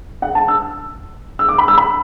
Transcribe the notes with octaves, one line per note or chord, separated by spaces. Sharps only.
F#5
A5
E6
E6
D6
B5
E6
B5